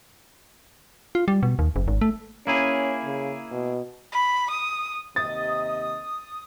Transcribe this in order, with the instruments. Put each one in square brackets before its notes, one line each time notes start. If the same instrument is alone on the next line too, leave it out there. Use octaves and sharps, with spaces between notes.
[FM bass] F4
G3
B2
D#2
F#1
G#1
A3
[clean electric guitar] A#3 E4 G#4 [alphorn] C#4
[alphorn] C#3
B2
[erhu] B5
D#6
[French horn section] D#2 C3 D#5 [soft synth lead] D#6 [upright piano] A6